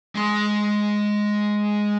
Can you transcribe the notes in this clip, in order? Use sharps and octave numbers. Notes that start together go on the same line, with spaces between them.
G#3 C6